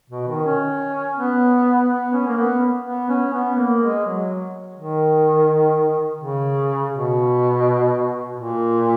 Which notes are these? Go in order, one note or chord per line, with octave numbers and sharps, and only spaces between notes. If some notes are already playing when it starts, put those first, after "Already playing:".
B2
D#3
C#4
B3
B3
C#4
A#3
B3
B3
C#4
B3
A#3
G#3
F#3
D#3
C#3
B2
A#2